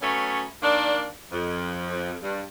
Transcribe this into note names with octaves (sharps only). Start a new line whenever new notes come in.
F#3 A3 B3 C#4
D#3 A#3 D4
F2
G2